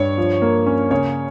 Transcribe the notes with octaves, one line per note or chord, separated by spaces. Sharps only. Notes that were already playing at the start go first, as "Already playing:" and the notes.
Already playing: G2 C#5
F3
A#3
C#4
C#3 C#5